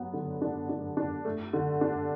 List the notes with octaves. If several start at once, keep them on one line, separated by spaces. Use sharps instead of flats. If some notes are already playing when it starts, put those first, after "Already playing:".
Already playing: F#3 B3
D3
D4
D4
D4
A3
D3
D4